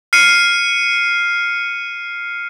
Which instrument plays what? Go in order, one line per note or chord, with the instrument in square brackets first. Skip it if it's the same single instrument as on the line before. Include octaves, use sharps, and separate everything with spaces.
[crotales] F6 C7 C#7 D#7